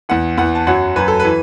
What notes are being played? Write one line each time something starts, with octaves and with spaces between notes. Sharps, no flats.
E2 E3 F#5
E2 E3 F#5
A5
F#2 F#3 F#5
F#2 F#3 B4
A4
B4
E3